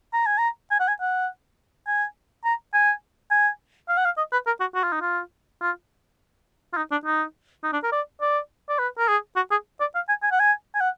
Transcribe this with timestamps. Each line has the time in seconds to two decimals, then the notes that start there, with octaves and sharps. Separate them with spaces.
0.13 A#5
0.26 G#5
0.38 A#5
0.71 G#5
0.79 F#5
0.88 G#5
1.01 F#5
1.87 G#5
2.44 A#5
2.74 G#5
3.31 G#5
3.89 F5
3.97 F#5
4.05 F5
4.17 D#5
4.32 B4
4.46 A#4
4.60 F#4
4.75 F#4
4.83 F4
4.92 D#4
5.01 F4
5.62 F4
6.73 F4
6.77 D#4
6.91 D4
7.05 D#4
7.64 D#4
7.73 D4
7.83 A#4
7.92 D5
8.21 D5
8.69 D5
8.79 B4
8.98 A#4
9.08 G#4
9.36 F#4
9.51 G#4
9.80 D5
9.95 F5
10.09 G#5
10.22 G#5
10.31 F#5
10.40 G#5
10.75 G#5
10.80 F#5